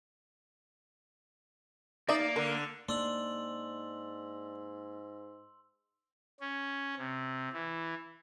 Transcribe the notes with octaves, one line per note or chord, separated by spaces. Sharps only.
A#3 D#4 D5 E5
D3 A#4
G#2 A#3 D4 C6 E6 F#7
C#4
C3
E3